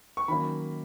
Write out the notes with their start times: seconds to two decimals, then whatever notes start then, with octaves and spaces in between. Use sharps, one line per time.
0.17 C#6
0.28 D#3 F#3 A#3 C#4 B5